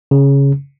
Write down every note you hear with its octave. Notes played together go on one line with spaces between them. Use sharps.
C#3